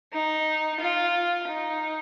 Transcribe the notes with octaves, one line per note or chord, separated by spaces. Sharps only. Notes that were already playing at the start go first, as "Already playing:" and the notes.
D#4
F4
D#4